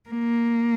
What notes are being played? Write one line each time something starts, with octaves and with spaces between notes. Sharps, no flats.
A#3